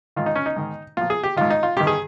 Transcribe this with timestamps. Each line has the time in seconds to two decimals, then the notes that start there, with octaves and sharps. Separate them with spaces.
0.16 G#2 D#3 F4
0.26 D#4
0.35 C#4
0.46 D#4
0.56 G#2 D#3
0.97 A#2 F3 F4
1.10 G#4
1.23 G4
1.36 G#2 D#3 F4
1.50 D#4
1.63 F4
1.77 G2 D#3 G4
1.87 G#4